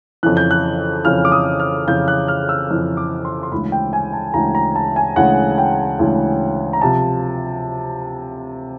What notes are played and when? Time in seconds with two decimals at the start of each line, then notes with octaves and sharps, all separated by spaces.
0.23 F2 C#3 E3 F#6
0.37 G6
0.51 F#6
1.05 F2 C#3 E3 F6
1.25 D6
1.32 D#6
1.60 F6
1.87 F2 C#3 E3 G6
2.08 F#6
2.28 F6
2.49 E6
2.70 F2 C#3 E3
2.97 D6
3.25 C6
3.43 C6
3.52 D2 C#3 E3 G#3 B5
3.72 G5
3.93 G#5
4.13 A5
4.34 D2 C#3 E3 G#3 A#5
4.55 A#5
4.76 A5
4.96 G#5
5.16 D2 C#3 E3 G#3 F#5
5.58 G5
5.99 D2 C#3 E3 G#3
6.73 A#5
6.81 C3 F3 A5